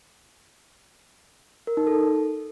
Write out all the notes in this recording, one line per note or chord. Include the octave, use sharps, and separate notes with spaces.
A#4
D#4
A4